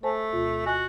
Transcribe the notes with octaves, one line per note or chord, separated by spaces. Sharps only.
A3 C5 G#5 A5
D2 B2 F4
F#4 D#5 G#5 F#6